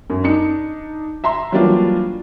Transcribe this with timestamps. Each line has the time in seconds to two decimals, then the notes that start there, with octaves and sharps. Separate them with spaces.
0.10 F#2
0.24 D4 D#4 C#7
1.24 E5 A#5 C6
1.52 E3 F#3 G3 A#3 D4 F4